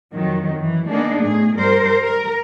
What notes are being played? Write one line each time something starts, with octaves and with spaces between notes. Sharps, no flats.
F2 D#3 F#3
F#2 E3
A#3 B3 D4 D#4 G#4
A2 G#4
G2 G3 A#4 C5
A#4